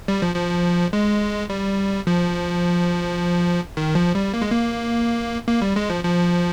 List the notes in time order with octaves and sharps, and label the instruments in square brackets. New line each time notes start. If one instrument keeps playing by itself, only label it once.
[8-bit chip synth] G3
F3
F3
G#3
G3
F3
D#3
F3
G3
A#3
G#3
A#3
A#3
G3
G#3
F3
F3